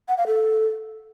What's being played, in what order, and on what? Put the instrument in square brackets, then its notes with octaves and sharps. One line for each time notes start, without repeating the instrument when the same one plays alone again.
[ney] F#5
F5
A4